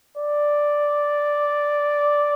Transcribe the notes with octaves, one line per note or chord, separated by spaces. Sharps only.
D5